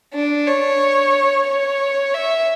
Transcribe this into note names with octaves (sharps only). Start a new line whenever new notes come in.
D4
C#5
C#5
E5